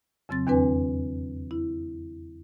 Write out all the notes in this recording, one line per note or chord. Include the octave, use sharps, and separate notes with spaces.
F2 C#3 F#3 C4 A6
E2 D#3 C4 D4 B4 G#5
E4